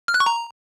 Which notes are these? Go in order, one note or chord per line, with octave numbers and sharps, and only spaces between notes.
F6
F#6
C#6
A#5